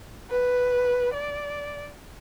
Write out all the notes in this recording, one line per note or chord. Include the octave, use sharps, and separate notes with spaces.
B4
D5